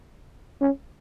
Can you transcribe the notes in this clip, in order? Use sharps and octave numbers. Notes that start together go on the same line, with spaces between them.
C#4